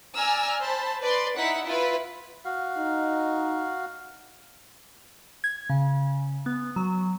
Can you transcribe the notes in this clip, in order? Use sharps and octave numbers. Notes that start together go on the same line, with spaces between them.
D5 G#5 A#5 E6 F6
C5 A5 B5
B4 D5 C6
D#4 E4 F#5 B6
E4 F4 B4 B5
F#4 F5
D#4
G#6
C#3
B3
F#3